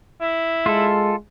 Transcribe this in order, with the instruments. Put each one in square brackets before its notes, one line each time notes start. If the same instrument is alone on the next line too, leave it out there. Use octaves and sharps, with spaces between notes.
[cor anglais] E4
[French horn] G#3 [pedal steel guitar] F4 A4